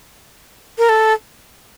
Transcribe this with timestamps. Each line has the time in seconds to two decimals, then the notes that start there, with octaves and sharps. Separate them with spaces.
0.78 A#4
0.89 A4